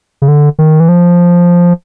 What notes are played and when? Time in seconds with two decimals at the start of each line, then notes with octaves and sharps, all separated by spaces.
0.22 C#3
0.28 D3
0.59 D#3
0.80 E3
0.89 F3